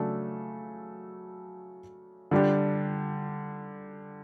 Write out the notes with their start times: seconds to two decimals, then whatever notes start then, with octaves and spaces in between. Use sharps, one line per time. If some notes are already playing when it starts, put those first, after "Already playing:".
Already playing: C#3 F#3 A3 D4 A4
2.31 D3 G3 D4 G4